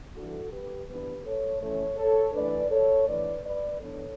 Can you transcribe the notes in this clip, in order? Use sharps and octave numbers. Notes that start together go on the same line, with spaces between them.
E3 G3 D4 F#4 A4
G4 B4
E3 B3 D4 G4 B4
A4 C#5
E3 A3 C#4 A4 C#5
A4 C#5
E3 A3 D4 B4 D5
A4 C#5
E3 A3 D4 B4 D5
B4 D5
E3 B3 D4 A4 C#5